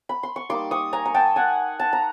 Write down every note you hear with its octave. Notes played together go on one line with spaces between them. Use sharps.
B5
C6
C#6
G3 A#3 D#4 C6 D6
C#6 D#6
G#5 A#5
A#5
G5 A5
F#5 G#5
A5
A#5